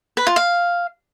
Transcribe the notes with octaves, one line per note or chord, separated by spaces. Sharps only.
B4
F4
F5